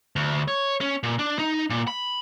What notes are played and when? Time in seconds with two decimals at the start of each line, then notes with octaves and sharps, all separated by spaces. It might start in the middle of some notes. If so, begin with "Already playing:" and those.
0.16 D2
0.48 C#5
0.81 C#4
1.03 A#2
1.19 D4
1.39 D#4
1.70 A#2
1.87 B5